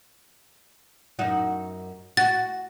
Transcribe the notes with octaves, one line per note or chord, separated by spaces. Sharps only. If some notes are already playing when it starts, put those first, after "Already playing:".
F#2 D#4 F#4
F#4 A6